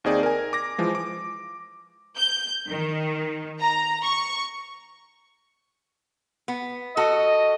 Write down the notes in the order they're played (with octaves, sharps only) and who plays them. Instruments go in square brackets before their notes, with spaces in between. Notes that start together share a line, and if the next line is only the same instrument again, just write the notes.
[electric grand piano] D#2 C4 D#4 G#4 D5
A#4 G#5
D6 A#6
E3 F3 G#3
D6
[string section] G6
D#3
A#5
C#6
[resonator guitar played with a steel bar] B3
[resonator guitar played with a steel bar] F#4 A4 [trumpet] D#5